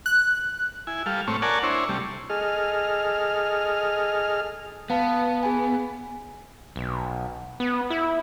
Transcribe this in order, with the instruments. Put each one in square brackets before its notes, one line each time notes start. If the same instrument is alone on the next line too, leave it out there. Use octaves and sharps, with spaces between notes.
[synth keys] F#6
[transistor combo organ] E4 G#5
G3 A4 F5
A2 A3 C4 C#5
A#4 C#5 D5 F#5 G#5 A5
D4 E4 C5 C#5
C3 G3 A3
G#4 A4 D#5 F6
[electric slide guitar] B3 [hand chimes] F5 A5
[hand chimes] G#4 G#5
[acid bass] B1
B3
E4